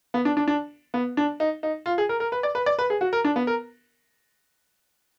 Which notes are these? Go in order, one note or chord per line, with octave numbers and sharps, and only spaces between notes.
B3
D4
D4
D4
B3
D4
D#4
D#4
F4
G#4
A#4
A#4
B4
D5
B4
D5
B4
G#4
F#4
A#4
D4
B3
A#4